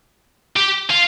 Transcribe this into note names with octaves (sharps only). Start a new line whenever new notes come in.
G4
F4